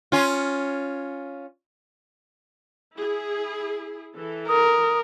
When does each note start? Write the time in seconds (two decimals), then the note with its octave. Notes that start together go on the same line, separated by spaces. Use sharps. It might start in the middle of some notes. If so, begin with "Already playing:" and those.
0.12 C#4 F4
2.96 E4 G#4
4.17 E3 A4
4.48 A#4 D#6